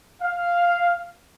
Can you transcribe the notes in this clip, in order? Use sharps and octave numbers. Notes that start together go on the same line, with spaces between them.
F5